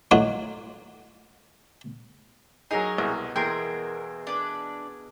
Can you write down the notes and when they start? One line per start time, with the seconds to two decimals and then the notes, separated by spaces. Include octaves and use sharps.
0.11 A2 D#3 F#3 F4 F#4 C#5
2.71 F#3 D#4 G#4 A#4 C#5 D#5 G#5
2.98 C2 B2
3.36 E2 G#4 A#4 G5 C6
4.27 D4 B4